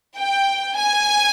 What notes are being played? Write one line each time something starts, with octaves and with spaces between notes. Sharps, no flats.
G5
G#5